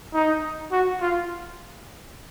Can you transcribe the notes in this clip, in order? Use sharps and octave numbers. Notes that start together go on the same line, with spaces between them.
D#4
F#4
F4